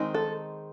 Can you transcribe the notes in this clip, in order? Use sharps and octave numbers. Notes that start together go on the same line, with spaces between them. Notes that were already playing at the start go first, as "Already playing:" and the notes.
Already playing: D#3 G#3 C4 D#4
A4